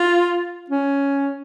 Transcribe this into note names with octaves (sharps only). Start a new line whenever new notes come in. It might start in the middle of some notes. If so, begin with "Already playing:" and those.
Already playing: F4
C#4